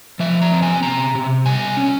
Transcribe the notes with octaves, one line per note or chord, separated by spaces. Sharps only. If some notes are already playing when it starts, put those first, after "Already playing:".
F3 E5
A#5
C4
G#5
C3 A#5
C3
G3 G#5
C#4